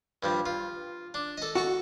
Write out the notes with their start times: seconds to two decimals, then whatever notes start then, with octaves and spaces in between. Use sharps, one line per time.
0.23 G2 F3 G3
0.46 F4
1.14 D4
1.37 A4 D#5
1.55 F#4 A4 A#5 C#6